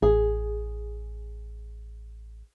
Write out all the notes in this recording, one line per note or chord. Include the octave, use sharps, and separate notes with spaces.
A1 G#4